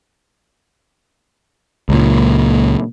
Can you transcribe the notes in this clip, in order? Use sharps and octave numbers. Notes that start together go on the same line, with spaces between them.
C#2 A#2